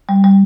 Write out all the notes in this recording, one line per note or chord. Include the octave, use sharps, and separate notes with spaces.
G3
G3